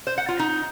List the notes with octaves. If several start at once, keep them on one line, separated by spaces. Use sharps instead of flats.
C5
F#5
F4
D#4